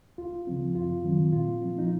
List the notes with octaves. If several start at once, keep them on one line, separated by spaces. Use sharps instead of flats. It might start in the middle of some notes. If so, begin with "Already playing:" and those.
C#2 F4
C#3 F3 C4
F#2 F4
D#3 F#3 C4
A#2 F4
F3 C4
D#4